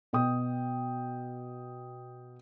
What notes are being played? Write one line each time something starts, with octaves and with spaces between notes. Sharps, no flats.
B2 G5 D#6